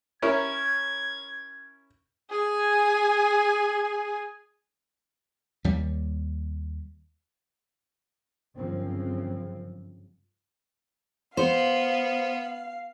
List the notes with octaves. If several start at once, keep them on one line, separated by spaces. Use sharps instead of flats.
C#4 E4 A#4 G#6
G#4 G#5
D#2 G3
G1 F#2 C#3 F3 C4
B3 C5 F5